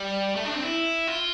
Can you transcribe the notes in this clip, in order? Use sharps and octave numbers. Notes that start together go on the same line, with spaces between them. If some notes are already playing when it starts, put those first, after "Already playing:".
Already playing: G3
A3
D4
C4
E4
F4